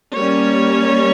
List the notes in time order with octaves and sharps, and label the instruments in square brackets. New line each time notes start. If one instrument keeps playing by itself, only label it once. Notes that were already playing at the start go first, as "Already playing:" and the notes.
[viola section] G3 A#3 C#4 C#5